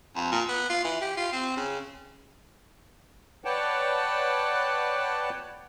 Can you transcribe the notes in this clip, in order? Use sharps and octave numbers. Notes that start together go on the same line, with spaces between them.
F2
A#2
B3
F4
E3
G4
F4
C4
C#3
B4 C#5 D5 F#5 G5 A5